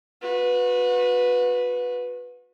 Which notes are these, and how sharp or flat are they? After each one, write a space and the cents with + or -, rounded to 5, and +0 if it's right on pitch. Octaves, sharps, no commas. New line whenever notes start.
F#4 -35 B4 +0